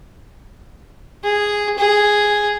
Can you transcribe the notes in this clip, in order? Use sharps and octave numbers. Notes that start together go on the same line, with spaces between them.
G#4
G#4